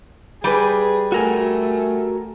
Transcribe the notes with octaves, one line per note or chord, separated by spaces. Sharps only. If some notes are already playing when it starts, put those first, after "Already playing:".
G3 G#4 B4
A3 F#4 A#4 G#5